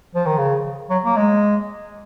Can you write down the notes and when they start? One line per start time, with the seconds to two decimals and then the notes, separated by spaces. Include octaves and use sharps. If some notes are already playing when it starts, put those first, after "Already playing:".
0.15 F3
0.26 D#3
0.38 C#3
0.90 F#3
1.05 A#3
1.17 G#3